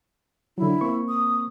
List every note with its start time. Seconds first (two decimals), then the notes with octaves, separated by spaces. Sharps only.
0.58 D3 F#3 E4
0.81 A#3 C4 C#6
1.09 D#6